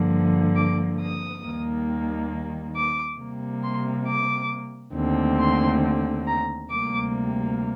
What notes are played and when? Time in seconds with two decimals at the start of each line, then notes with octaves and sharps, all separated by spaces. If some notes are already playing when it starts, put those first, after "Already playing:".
Already playing: G2 D3 F3 A#3
0.56 D6
0.99 D#6
1.43 D#2 D#3 G3 A#3
2.75 D6
3.19 C3 G3 A#3
3.63 C6
4.07 D6
4.95 D#2 D3 A3 C4
5.39 C6
6.27 A#5
6.70 D2 C3 G3 A#3 D6